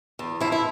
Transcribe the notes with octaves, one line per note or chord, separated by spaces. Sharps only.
E2
F3 E4
E4